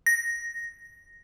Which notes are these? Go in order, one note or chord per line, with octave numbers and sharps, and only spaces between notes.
A#6